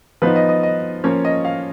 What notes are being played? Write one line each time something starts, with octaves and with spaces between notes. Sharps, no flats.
F3 B3 D#4 B4
D#5
D#5
D#5
F3 A#3 C#4 C#5
D#5
F5